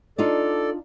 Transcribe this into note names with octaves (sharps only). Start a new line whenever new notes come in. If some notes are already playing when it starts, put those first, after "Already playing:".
D4 D#4 F4 A4 D5